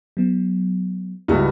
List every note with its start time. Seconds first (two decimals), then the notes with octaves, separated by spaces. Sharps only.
0.17 F#3 B3
1.28 C#2 G2 E4 F#4